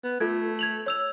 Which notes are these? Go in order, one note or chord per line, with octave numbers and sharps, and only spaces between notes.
B3
A3 F4 A4 G#6
G#6 F7 F#7
C#5 E6 F7